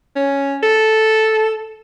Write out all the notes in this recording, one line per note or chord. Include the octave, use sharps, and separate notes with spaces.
C#4
A4